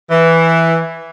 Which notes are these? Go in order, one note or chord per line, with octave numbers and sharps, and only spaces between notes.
E3